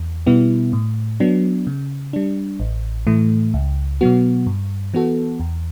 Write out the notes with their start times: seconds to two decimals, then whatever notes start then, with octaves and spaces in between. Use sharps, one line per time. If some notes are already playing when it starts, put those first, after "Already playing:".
Already playing: E2
0.27 B2 G3 B3 E4
0.73 A2
1.20 F#3 B3 D4
1.67 C#3
2.13 G3 D4
2.60 A1
3.07 A2 E3 A3
3.54 C#2
4.01 B2 F#3 B3 F#4
4.47 G2
4.94 E3 B3 F#4 A4
5.40 E2